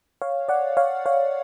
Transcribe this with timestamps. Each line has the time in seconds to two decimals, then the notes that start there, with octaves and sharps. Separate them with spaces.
0.22 C#5 F5
0.49 D5 F#5
0.77 C#5 F5
1.06 C#5 F5